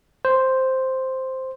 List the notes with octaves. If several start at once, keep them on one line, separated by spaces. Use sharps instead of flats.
C5